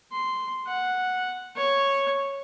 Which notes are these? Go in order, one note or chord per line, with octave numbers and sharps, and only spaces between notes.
C6
F#5
C#5